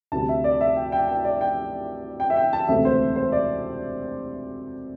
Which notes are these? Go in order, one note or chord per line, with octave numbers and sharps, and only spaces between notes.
D2 C3 G3 A5
E5
D5
E5
G5
G5
G5
D5
G5
G5
E5
G5
A5
E1 D2 C3 A3 C4 E5
C5
C5
D5